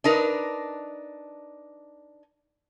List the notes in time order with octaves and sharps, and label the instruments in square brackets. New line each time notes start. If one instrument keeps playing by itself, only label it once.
[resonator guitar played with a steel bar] D4 D#4 A#4 B4